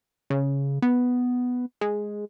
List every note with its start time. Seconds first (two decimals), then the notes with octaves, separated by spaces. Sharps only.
0.30 C#3
0.82 B3
1.81 G#3